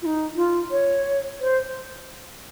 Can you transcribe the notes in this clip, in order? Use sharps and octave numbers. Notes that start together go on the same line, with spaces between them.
F4
D#4
F4
C#5
C5